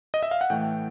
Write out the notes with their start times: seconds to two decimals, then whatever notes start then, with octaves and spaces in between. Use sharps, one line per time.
0.14 D#5
0.23 E5
0.31 F5
0.41 F#5
0.50 A2 E3 A3 G5